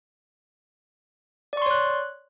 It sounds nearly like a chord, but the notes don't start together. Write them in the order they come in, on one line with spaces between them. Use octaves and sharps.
D5 C#6 C6 C#5 F#6